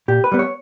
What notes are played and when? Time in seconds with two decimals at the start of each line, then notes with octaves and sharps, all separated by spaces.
0.08 A#2 G4
0.24 B4
0.32 G3 B3
0.39 C#5